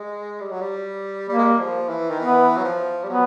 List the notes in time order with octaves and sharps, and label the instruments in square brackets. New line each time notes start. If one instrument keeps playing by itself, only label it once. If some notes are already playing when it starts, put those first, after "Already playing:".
Already playing: [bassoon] G#3
G3
F#3
G3
[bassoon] G3 [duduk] A#3
[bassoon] G#3
G3
F3
E3
D#3
[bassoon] E3 [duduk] B3
[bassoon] F#3
F3
G3
[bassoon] F#3 [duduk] B3